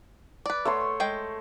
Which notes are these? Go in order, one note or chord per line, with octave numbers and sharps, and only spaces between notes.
B4 D5
A3 C#5 C6
G#3 G5